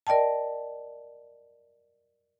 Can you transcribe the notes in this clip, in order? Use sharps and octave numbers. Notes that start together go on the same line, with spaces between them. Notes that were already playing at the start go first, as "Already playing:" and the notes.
A#4 D5 D#5 G5 A5